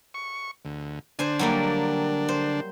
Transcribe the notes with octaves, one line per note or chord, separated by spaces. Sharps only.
C#6
D2
D3 D4 C5 G#5
F#3 G3 A#3
C5